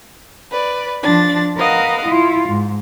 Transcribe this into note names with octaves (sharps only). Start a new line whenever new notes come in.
B4 D5
F3 D4 A6
A#4 B4 D#5 F5 F#5
E4 F4
G#2